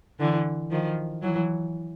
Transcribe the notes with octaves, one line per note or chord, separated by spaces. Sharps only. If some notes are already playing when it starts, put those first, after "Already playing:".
D3 E3
D#3 F3
E3 F#3